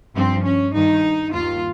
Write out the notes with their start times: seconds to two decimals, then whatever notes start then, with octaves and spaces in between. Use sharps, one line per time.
0.15 G2 F3 C4
0.44 C#4
0.74 G2 D#3 D#4
1.34 D#2 D#3 F4